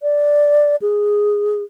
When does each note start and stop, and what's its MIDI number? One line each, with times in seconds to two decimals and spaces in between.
0.02 0.76 74
0.82 1.63 68